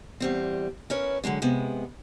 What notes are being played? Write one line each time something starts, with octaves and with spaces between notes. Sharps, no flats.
E2 G3 C4
C#4 E4 A#4 B4 C#5
D3 F#3 G#3 D4
C3 G#3 B3